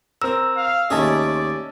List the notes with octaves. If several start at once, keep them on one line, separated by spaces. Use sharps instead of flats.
C4 A#4 E6
F5
D#2 A3 C#4 G#4 D5 D#5 A5